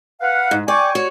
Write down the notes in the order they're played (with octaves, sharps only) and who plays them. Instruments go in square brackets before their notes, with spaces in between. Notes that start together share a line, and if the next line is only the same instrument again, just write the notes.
[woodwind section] B4 F5 F#5
[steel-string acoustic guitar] G#2
[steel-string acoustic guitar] D5 [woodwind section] G5 G#5 C#6
[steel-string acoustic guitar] F#4 [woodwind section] C#5